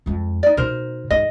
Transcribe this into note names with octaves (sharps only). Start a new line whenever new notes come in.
F2 G#3
D#4 D5
B2 D#4 A#4 C5
G#2 E3 D#5